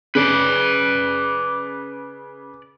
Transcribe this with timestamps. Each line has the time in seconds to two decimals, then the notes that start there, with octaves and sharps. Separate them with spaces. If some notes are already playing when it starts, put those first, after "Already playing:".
0.15 C#3 B4 D5